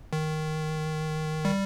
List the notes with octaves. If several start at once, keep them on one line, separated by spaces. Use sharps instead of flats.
D#3
G3